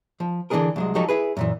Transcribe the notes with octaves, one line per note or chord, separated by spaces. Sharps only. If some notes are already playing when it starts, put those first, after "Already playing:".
F3
D3 E3 A3 D4 G#4 A#4
C2 F#3 G#3
F3 F#3 D#4 G4 A4 C#5
E4 G#4 B4
F#2 A#2 E3